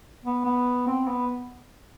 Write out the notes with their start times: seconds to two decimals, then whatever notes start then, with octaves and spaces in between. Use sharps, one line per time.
0.24 B3
0.45 B3
0.87 C4
1.07 B3